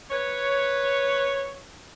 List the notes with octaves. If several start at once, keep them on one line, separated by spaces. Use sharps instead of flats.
B4 C#5